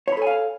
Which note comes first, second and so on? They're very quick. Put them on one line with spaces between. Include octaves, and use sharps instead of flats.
C#5 B5 A4 G#5 F5